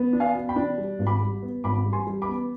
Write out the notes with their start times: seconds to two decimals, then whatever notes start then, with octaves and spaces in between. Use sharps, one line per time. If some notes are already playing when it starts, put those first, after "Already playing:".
Already playing: B3
0.13 D4
0.20 F5 G#5
0.34 B2
0.49 G5 B5
0.56 D4
0.78 G3
0.99 G#1
1.07 B5 D6
1.21 G3
1.43 B3
1.64 G#1 B5 D6
1.86 G3
1.93 G#5 C6
2.07 G3
2.22 B5 D6
2.29 B3